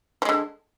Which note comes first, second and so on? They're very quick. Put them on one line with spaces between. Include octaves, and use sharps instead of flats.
F3 G#3 D3